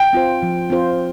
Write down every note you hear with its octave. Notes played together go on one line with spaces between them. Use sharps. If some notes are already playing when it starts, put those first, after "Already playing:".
Already playing: G5
C4 F4 C5
F3
C4 F4 C5